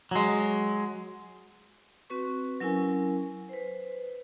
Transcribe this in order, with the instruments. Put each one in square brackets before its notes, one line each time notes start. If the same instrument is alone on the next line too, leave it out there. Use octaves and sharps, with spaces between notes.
[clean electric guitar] F#3 G#3
[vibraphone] C4 F#4 B4 C#6
F#3 C#4 E4 A#4 G#5
B4 C5